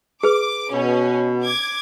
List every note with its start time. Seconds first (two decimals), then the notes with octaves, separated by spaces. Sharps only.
0.23 G#4 B4 D6
0.72 B2 C#4
1.43 D6 G#6